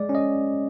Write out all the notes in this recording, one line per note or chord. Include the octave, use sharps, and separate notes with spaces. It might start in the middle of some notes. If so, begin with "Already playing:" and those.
Already playing: G#3 D5
C#4
D#5